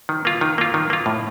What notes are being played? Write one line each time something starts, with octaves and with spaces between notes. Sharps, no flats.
D#3
A#3 F4
D#3
A#3 F4
D#3
A#3 F4
A2